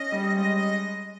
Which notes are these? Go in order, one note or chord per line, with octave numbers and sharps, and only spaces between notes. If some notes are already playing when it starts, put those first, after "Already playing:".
Already playing: C#4 D#5
G3
G#3 D#5
D#5